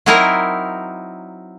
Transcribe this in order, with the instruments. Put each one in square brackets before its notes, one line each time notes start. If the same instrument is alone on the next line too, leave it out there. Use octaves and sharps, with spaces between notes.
[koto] F#3 C4 D#4 E4 A#4 A#5